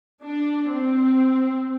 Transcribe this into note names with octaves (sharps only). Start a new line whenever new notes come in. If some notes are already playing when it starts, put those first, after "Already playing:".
D4
C4